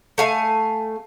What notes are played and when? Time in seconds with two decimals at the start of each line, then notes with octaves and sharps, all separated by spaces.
0.18 A3 F5 G#5